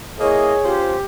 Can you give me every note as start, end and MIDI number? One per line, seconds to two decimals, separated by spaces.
0.20 0.54 58
0.20 0.54 64
0.20 0.75 68
0.20 0.77 73
0.20 0.54 75
0.65 0.97 61
0.65 0.97 65
0.65 1.04 67
0.65 0.97 72